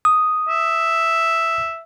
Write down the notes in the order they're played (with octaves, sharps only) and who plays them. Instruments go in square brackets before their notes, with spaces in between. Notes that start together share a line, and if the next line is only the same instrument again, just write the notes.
[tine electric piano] D#6
[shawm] E5